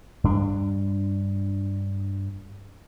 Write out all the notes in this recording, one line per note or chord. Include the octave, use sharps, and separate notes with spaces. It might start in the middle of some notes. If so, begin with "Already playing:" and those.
G2 D4